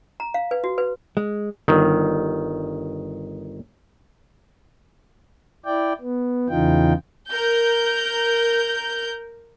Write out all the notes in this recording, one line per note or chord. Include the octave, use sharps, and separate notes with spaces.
A#5
F5
B4
F#4
B4
G#3
G1 D#3
E4 D5 G5
B3
E2 C#3 E3 D#4 F4 G5
A#4 G6